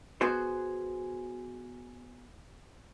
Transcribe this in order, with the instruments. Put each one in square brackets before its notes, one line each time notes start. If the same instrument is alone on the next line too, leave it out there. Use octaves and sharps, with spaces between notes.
[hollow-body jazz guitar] B3 F#4 G#4 C5